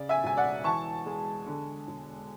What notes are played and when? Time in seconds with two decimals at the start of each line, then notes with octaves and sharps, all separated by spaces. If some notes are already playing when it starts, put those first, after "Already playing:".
Already playing: C#3 D5
0.09 E5 G#5
0.24 E1 G#5
0.37 D5 F#5
0.64 E3 A5 C#6
1.06 G#3
1.46 D3
1.88 E1